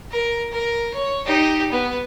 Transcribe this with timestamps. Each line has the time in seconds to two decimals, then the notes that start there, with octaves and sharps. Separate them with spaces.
0.11 A#4
0.51 A#4
0.93 C#5
1.26 D#4 G4
1.72 B3